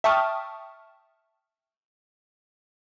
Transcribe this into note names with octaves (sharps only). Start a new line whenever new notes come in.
E5 G5 A5 C#6 D#6 F6